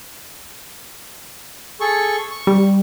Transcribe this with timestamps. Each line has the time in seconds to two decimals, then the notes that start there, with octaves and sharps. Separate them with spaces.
1.81 G#4 A4 C#6
2.31 C#6
2.47 G3